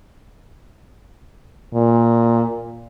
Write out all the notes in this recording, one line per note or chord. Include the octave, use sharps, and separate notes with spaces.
A#2